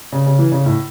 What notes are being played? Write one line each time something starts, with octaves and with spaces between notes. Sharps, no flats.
C#3
C#3
E3
C#3
A2